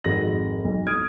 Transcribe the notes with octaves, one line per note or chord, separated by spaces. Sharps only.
G#1 F2 G#3 F#4 A#6 F#7
B1
D#6 F6 G#6 D7 D#7